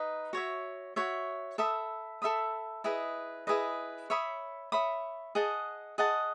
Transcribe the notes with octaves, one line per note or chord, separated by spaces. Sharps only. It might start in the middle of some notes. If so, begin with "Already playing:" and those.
Already playing: D#4 B4 D#5
F#4 C#5 E5
F#4 C#5 E5
A4 E5 B5 D#6
A4 E5 B5 D#6
E4 G#4 B4 D#5
E4 G#4 B4 D#5
C#5 E5 B5 D#6
C#5 E5 B5 D#6
G#4 D#5 F#5 A5
G#4 D#5 F#5 A5